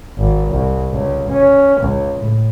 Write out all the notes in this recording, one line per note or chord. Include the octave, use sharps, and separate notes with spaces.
G#1
C2
C#2
C#4
C#2
A2